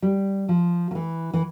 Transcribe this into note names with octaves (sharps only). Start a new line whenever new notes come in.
G3
F3
F3
E3
E3